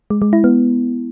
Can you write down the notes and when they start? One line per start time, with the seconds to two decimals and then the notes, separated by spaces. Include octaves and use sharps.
0.10 G#3
0.22 G#3
0.33 E4
0.44 B3